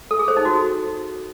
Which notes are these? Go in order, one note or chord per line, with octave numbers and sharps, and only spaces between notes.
A4
G#4
C5
D#4
F#4